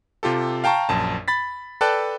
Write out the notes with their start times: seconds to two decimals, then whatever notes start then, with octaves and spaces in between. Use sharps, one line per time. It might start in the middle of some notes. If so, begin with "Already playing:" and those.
0.23 C3 F4 G4 A4
0.64 F5 G5 A5 A#5 C#6
0.89 A#1 F#2 A5
1.28 B5 A6 B6
1.81 A4 B4 D5 G5 A5 F#6